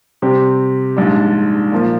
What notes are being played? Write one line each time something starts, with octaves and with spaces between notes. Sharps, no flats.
C3 G3 C4 G4
A#1 G#2 G3 D4
A#2 F3 A#3